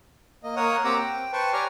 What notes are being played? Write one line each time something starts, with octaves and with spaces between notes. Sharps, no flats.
A#3 D#5
A#3 A#4 C#5 F#5 D#6
C4 G4 F#5 A#5 D6 E6
G5
B4 C5 G5 A5 C#6
G4 C#5 D5 G#5 A#5 F6